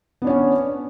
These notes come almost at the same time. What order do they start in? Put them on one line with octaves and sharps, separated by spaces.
B3 D4 C#5 C#4